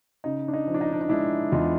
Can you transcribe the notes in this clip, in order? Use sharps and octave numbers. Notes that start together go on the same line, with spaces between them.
C#3 D#4
D4
D#4
F3
D4
D#4
D4
D#4
G#3 D4 E4
E2 D#4 F4